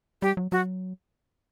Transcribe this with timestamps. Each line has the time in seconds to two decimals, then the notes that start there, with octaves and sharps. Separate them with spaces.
0.22 G3 G4
0.37 F#3
0.52 F#3 F#4